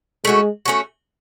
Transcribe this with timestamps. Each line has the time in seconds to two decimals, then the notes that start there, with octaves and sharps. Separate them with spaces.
0.25 G#3 A3 C#4 F#4
0.65 A3 C#4 F#4